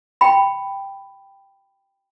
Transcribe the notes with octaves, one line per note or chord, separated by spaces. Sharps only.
G5 B5